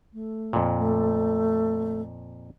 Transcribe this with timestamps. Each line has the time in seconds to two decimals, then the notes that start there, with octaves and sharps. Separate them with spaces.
0.13 A3
0.53 F2 A#2
0.79 A3